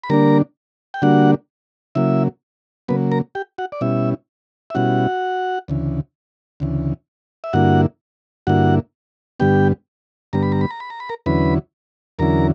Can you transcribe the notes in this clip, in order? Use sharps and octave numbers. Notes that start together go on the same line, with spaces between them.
B5
D3 G3 A#3 D4 A#4 A#5
G5
D3 G3 A#3 D4 F#4 F#5
C#3 F#3 A#3 E4 E5
C#3 F#3 A#3 B3 B4
A#4 A#5
G4 G5
F#4 F#5
D5
B2 G3 C#4 E4 E5
E5
B2 G3 C#4 E4 F#4 F#5
D2 C#3 E3
D2 C#3 E3
E5
G2 D3 A#3 E4 F#4 F#5
G2 D3 A#3 E4 F#4 F#5
G2 D3 G3 B3 G4 G5
G2 D3 G3 B3 A#5
B5
A#5
B5
A#5
B5
A#5
B5
A#4 A#5
E2 D3 F#3 C#4 E4 B4 B5
E2 D3 F#3 C#4 E4 A#4 A#5